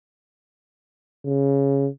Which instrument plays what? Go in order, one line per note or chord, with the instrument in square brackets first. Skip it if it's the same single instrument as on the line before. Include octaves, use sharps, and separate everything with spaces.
[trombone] C#3